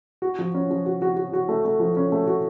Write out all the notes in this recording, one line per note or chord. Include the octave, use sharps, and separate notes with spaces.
F#4
F3
C#4
F3
F#4
F#4
F#4
F#4
A3
A3
F3
C#4
A3
F#4